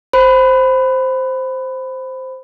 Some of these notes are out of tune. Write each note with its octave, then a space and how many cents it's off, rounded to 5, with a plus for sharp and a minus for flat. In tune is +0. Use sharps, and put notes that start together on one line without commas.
C5 +0 B5 +15